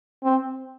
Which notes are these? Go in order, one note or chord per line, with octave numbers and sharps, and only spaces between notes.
C4